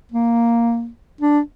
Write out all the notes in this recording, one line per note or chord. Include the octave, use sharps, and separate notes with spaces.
A#3
D4